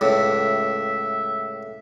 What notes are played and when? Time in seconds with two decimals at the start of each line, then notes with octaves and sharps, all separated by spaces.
0.01 C#2 A2 E5